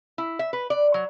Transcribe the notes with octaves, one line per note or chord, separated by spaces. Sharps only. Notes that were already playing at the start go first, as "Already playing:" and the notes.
E4
E5
B4
D5
F#3